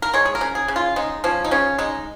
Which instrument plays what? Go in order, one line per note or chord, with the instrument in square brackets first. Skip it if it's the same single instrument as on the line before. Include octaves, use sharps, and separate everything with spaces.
[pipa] A#4
G#3 C#5
G#4
A#4
C#3
G#4
C#3
F4
G#3 D#4
F3 C#4
D#4
C#3 C#4
G#3 D#4